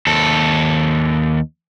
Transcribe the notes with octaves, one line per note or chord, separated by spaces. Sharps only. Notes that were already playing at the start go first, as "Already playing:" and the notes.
D#2 A4